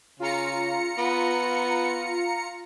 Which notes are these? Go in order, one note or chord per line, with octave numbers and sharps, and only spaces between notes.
C#3 F4 A#5 C#7
B3